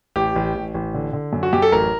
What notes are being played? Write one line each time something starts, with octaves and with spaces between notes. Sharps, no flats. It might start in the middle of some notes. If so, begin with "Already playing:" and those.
A1 G4
A1
A1
A1
D3
D3
F#2
F#4
F#2 G4
A4
A1 A#4